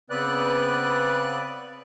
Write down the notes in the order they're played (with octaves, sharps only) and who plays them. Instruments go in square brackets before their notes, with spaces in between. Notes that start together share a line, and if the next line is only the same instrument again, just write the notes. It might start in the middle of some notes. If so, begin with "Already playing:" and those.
[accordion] C#3 B3 C4 B4 D5 F#6